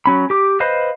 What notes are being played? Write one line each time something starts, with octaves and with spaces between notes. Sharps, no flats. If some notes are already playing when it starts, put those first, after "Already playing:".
F#3 C#4 B5
G4 D6
B4 C5 D#5 F5 B5